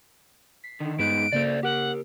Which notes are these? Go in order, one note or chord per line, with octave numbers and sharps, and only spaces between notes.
B6 C7
D3 D#3
G2 G#3 B3 D#4 F#6 D7
C#3 A#3 A4 C5 D5
G4 A#4 F#5